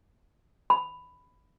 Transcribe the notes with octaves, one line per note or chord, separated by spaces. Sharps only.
B5